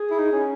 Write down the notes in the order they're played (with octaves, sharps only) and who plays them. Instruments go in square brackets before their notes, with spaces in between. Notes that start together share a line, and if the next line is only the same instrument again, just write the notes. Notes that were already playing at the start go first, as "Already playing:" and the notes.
Already playing: [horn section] G#4
[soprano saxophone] E4
D#4
C#4